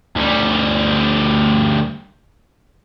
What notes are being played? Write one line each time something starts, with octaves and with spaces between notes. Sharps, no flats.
D2 G3